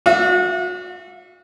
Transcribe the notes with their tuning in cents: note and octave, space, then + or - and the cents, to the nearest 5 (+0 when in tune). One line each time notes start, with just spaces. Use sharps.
F#4 -35 E5 +35